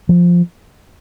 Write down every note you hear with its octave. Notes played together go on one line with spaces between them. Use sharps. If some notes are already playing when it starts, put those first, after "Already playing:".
F3